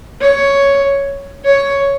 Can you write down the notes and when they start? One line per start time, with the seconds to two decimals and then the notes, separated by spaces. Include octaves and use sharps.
0.21 C#5
1.45 C#5